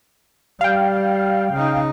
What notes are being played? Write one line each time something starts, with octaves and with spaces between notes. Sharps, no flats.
G3 F5 G5
C#3 D#4